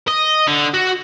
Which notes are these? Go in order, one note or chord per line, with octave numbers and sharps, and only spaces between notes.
D#5
D3
F#4